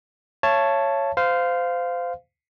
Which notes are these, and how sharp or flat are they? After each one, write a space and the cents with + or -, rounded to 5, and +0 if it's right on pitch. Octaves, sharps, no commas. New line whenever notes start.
C#5 +0 E5 +45 A5 +0
C5 -25 F5 +0